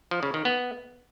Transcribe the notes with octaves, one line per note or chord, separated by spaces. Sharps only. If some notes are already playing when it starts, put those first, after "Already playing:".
F3
C#3
D#3
B3